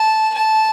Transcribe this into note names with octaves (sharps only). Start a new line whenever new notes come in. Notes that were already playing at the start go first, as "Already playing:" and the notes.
Already playing: A5
A5